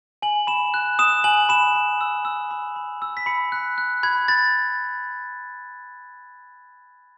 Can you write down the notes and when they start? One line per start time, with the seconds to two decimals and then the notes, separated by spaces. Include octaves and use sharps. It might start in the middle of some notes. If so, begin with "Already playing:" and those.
0.22 G#5 F#7
0.47 B5 E7
0.74 F#6
0.99 D#6 E7
1.24 G#5 F#7
1.49 B5 E7
1.75 B5
2.01 E6
2.25 E6
2.51 B5
2.76 B5
3.02 E6
3.17 B6
3.26 B5 C#7
3.52 F#6
3.78 F#6
4.03 B5 G#6
4.28 B5 A6